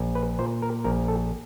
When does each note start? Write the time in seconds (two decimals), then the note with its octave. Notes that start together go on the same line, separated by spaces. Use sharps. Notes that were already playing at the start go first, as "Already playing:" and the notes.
Already playing: A#1
0.15 B4
0.39 A#2 C5
0.62 A#4
0.84 A#1 A#4
1.08 A4